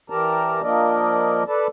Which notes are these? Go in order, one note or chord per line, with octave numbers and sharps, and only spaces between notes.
E3 G4 A#4 D5 A5 A#5
F3 A#3 D4 A#4 D5 D#5
A4 B4 D5 A5